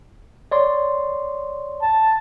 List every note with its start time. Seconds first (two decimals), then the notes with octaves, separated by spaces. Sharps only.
0.51 C#5 D5 C6
1.82 A5